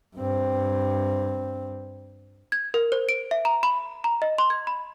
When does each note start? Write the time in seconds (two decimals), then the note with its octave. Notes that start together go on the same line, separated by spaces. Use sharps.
0.16 G2 C4
2.52 G#6
2.74 A#4
2.92 C5
3.09 D7
3.31 E5
3.45 A#5
3.63 B5
4.04 A#5
4.22 D#5
4.38 C6
4.50 G#6
4.67 B5